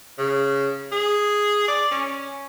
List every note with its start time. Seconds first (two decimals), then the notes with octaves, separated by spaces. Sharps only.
0.19 C#3
0.92 G#4
1.68 D5
1.91 C#4